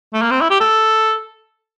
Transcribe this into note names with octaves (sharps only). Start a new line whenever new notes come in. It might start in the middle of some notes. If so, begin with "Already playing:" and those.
A3
A#3
C4
E4
G4
A4